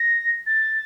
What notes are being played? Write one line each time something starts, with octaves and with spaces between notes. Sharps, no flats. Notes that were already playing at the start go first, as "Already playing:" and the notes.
Already playing: A#6
A6